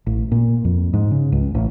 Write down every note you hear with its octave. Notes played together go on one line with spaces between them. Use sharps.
A1
A#2
F2
G#2
C#3
C#2
A1